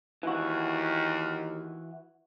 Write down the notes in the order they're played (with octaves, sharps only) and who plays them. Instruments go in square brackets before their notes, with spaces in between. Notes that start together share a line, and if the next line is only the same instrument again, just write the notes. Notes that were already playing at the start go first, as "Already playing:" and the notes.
[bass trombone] D#2 [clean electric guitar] E3 F#4